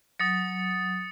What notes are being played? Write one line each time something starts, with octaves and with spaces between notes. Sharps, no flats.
F#3 D#6 A6 C#7